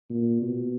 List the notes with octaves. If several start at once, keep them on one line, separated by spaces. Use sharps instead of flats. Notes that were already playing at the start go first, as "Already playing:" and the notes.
A#2
B2